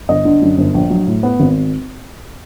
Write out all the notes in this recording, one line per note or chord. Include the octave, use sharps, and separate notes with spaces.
G1 D#5
D3
F#2
G1
A#1
F#3
A2
B3
G#1